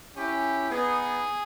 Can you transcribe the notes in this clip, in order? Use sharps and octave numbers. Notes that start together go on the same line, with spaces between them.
C#4 E4 G4
B3 D#4 G#4